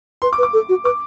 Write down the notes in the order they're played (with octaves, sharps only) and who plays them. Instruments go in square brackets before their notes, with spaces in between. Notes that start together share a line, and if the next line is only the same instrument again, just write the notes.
[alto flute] B4 [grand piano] C6
[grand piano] D6
[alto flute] B4
[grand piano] D6
[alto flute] A4
F#4
[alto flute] B4 [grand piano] D6